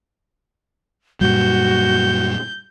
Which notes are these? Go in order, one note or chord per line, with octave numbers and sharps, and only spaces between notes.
F#2 A#2 G3 F#4 G6